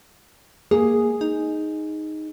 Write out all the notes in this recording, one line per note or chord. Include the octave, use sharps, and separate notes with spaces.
A#3 G#4
D#4